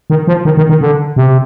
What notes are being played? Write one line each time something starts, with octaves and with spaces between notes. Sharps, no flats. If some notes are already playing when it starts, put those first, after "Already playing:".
D#3
F3
D#3
D#3
D#3
D3
C3